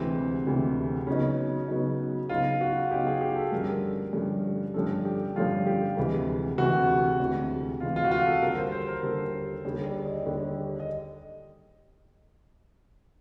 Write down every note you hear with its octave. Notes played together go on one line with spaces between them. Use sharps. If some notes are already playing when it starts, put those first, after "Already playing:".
Already playing: D2 C3 E3 G#3 C4
D2 C3 E3 G#3
C#3 F#3 B3 C#4 D#4
C#3 F#3 B3 D#4
C#3 F#3 B3 D#4 F4
F#4
C#3 F#3 B3 D#4 G4
G#4
G4
A4
G2 D3 F3 A3 C#4 A#4
G2 D3 F3 A3 C#4
G2 D3 F3 A3 C#4 A4
G4
G2 D3 F3 A3 C#4 F4
G4
D2 C3 E3 G#3
D2 C3 E3 G#3 F#4
D2 C3 E3 G#3
D2 C3 E3 G#3 F4
F4
F#4
F4
A4
D#2 D3 G3 A#4
C5
C5
A#4
D#2 D3 G3 A4
D#2 D3 G3 G#4
D5
D#5
D#2 D3 G3
D#5